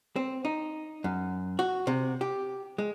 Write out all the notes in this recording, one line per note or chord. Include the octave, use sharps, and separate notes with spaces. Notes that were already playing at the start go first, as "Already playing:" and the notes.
C4
D#4
F#2
F#4
C3
G4
G#3